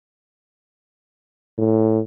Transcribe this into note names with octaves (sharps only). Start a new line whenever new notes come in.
A2